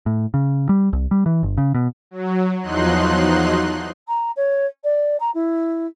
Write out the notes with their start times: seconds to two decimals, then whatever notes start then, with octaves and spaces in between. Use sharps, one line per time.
0.06 A2
0.34 C#3
0.69 G3
0.93 C2
1.11 G3
1.26 E3
1.43 G1
1.58 C#3
1.74 B2
2.11 F#3
2.62 E2 F3 F#3 D#4 C6 F#6
4.08 A#5
4.36 C#5
4.84 D5
5.20 A#5
5.34 E4